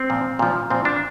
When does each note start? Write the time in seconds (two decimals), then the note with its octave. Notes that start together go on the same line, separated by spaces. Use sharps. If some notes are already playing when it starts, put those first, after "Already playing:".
Already playing: C4
0.10 A#2 F3
0.39 A#2 F3
0.70 A#2 F3 C4
0.85 D4